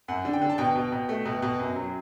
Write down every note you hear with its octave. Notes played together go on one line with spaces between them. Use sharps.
F#2 F#5
D3
G5
D3
A5
B2 G5
B2
B2
A3
B2
B2
F#2
F#3